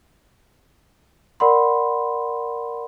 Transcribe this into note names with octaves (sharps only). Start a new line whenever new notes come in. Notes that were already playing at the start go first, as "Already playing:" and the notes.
A#4 D5 F#5 B5 C6